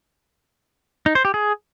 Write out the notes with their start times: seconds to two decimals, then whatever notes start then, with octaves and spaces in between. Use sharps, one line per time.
1.06 D#4
1.15 C5
1.25 G4
1.34 G#4